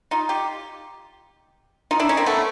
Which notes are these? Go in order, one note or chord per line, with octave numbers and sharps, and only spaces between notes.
D#4 F4
F4 G4
D#4 F4
D4 E4
C#4 D#4
A#3 C4
A3 B3